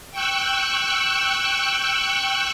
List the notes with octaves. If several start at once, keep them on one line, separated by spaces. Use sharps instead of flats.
G5 C#6 E6 F#6